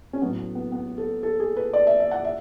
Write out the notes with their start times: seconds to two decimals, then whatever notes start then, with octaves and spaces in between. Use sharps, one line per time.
0.13 C#4
0.22 A2 F#3 B3
0.55 B3
0.72 B3
0.98 A4
1.23 A4
1.40 G#4
1.57 B4
1.73 D5
1.87 E5
2.00 E5
2.11 F#5
2.25 E5